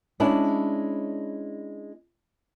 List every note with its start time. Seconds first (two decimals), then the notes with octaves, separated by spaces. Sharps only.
0.20 G#3 C#4 D4 E4